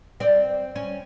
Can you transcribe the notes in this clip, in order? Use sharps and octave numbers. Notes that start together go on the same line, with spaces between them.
C4 D5
C#4